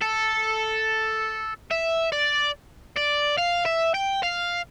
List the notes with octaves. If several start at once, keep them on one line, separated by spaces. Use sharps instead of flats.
A4
E5
D5
D5
F5
E5
G5
F5